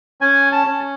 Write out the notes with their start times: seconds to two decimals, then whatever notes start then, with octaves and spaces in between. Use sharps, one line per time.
0.21 C#4 G#5
0.52 A5
0.67 C#4